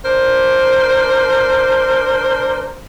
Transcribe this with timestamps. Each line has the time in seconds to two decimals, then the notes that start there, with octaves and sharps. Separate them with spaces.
0.05 D4 A#4 C5